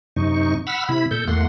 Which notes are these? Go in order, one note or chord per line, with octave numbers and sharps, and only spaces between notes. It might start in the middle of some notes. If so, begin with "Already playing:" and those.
F#2 C3 D#4 C#6
F#5 B5 E6 F6
C3 E4 B5
A#2 A4 G6
E2 A3 A#3 F#5 C6